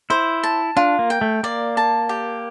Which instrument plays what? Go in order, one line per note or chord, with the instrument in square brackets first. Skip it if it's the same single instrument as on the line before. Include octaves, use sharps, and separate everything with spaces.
[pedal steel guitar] E4 [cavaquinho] C5
[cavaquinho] A5
[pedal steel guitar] D4 [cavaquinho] F4
[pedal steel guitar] A#3
[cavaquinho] G5
[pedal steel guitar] A3
[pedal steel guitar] A#3 [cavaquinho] D5
[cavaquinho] A5
G4